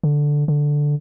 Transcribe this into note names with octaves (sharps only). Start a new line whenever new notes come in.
D3
D3